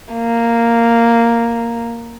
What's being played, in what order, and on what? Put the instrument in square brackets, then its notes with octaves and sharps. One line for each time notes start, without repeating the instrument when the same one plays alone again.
[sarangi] A#3